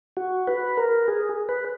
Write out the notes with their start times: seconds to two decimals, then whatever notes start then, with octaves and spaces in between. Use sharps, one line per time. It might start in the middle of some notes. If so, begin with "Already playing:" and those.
0.17 F#4
0.47 B4
0.77 A#4
1.08 G#4
1.49 B4